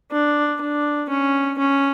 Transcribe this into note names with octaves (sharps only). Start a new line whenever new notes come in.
D4
D4
C#4
C#4